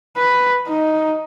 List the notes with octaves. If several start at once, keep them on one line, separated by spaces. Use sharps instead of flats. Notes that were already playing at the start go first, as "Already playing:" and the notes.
B4
D#4